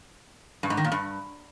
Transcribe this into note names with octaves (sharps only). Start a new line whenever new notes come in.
G2
G#2
D#3
A#2
G2